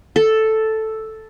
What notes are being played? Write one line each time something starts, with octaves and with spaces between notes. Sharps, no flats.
A4